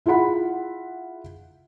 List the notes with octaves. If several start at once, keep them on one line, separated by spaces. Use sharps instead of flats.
E4 F4 G#4 F#5 B5